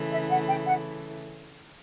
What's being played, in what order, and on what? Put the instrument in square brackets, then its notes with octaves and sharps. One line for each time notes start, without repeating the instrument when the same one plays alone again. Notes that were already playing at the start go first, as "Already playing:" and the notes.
Already playing: [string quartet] C#3 E3 A3
[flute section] E5
F#5
G5
F#5